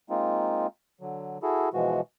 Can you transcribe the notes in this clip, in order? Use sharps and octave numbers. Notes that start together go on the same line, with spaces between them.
G#3 A#3 C4 D#4 F4
D3 F#3
E4 F#4 G#4 A4
B2 E3 F3 G#3 F#4